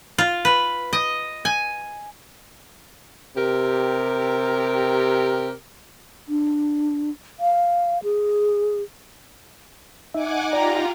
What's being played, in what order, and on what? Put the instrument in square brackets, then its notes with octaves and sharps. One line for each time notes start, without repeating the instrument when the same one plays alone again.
[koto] F4
B4
D#5
G#5
[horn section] C3 G4 A#4
[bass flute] D4
F5
G#4
[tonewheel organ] D#4 [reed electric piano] E5 [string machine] F#5 G#5 D6
[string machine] F4 [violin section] G4 G5 A#5 [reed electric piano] D5